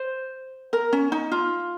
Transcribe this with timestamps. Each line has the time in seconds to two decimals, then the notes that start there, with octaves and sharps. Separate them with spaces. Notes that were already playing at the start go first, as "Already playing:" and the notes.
Already playing: C5
0.73 A#4
0.93 C#4
1.12 D#4
1.32 F4